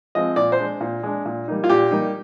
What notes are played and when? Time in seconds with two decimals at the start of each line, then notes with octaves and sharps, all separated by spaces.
0.15 F3 G#3 C4 D#5
0.36 A#2 D5
0.52 C5
0.59 G#3 D4
0.80 A#2
1.03 G#3 D4
1.25 A#2
1.48 G3 A#3 D#4
1.64 F4
1.69 A#2 G4
1.91 G3 A#3 D#4